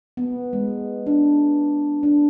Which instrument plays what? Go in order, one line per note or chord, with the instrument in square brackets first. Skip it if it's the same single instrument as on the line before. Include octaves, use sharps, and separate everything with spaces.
[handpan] B3
G#3
D4
D4